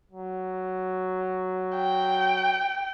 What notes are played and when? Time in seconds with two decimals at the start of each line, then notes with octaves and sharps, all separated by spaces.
0.11 F#3
1.75 G5